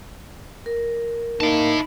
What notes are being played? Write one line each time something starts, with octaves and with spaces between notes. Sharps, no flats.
A#4
A#3 D#4 E4 A5